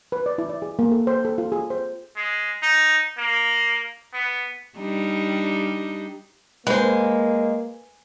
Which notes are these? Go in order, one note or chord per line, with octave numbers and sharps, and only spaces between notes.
B4
D5
E4
D5
G#4
A#3
A4
C5
A4
F4
G#4
C5
G#3
D#4
A#3
B3
G3 D4 D#4
G#3 A#3 B4 C5